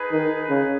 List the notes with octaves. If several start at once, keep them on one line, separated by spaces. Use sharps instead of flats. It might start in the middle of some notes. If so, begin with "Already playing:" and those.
Already playing: D#4 G#4 B4
D#3
C#3